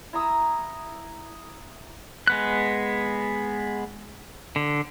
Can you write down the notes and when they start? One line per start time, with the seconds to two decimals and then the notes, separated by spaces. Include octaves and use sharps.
0.13 E4 A#5 D#6 E6
2.27 G#3 B3 F#6
4.56 D3